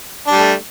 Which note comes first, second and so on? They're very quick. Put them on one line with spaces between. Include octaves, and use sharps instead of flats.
D4 G3 A3